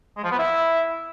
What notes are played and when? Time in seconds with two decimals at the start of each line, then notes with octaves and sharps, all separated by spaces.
0.17 G#3
0.24 F3
0.31 B3
0.39 E4